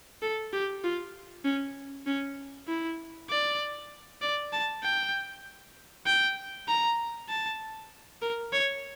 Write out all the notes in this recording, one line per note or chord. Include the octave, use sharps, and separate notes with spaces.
A4
G4
F4
C#4
C#4
E4
D5
D5
A5
G5
G5
A#5
A5
A#4
C#5